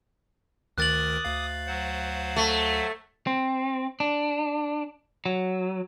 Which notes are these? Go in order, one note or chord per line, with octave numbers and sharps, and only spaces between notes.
D2 D#3 A#4 D6 D#6 F#6 A6 F#7
D2 F5
F#3 C5 F#5
A3
C4
D4
F#3